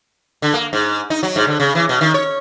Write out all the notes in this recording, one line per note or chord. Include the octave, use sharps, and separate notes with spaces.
D3
A#3
G#2
D#4
F#3
G#2
D3
C#3
E3
B2
D#3
C#5